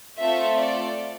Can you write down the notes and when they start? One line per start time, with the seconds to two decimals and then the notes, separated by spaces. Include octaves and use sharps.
0.19 A3 C4 F4 A4 E5
0.58 D5